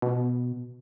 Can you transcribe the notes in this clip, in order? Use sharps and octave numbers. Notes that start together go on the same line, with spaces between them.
B2